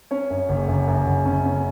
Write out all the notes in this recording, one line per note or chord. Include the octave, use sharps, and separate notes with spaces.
C#4 C#5
F#2
F#1
F#2
F#2
F#1
C#4
C#4